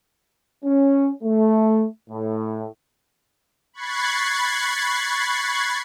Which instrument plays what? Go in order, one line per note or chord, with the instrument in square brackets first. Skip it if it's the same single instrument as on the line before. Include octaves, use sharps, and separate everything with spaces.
[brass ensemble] C#4
A3
A2
[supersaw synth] B5 C#6 F#6 G#6 A6 C7